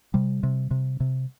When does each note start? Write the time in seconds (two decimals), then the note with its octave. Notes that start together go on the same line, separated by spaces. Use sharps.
0.14 C3 G3
0.43 C3
0.71 C3
1.00 C3